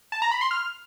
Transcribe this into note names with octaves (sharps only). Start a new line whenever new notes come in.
A5
A#5
B5
C6
F6